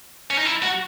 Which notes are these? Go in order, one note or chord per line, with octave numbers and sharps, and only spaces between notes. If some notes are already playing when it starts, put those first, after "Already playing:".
C#4
D#4
E4
F#4